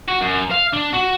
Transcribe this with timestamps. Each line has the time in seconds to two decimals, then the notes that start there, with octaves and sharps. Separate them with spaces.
0.08 F#4
0.21 F#2
0.51 F5
0.73 D4
0.93 F#4